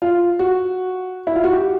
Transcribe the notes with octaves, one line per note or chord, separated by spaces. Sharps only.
F4
F#4
E4
F4
F#4
G4